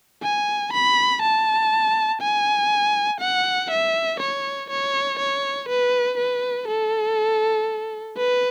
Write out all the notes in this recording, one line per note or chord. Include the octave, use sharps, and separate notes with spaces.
G#5
B5
A5
G#5
F#5
E5
C#5
C#5
C#5
B4
B4
A4
B4